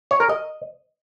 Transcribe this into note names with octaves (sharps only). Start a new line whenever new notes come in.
C#5
A#4
D#5